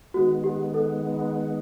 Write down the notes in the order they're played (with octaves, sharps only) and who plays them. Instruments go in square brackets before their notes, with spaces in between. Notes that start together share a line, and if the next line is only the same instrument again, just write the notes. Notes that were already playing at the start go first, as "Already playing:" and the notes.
[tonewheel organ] D#3 G#3 B3 [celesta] F#4
[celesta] G4
A4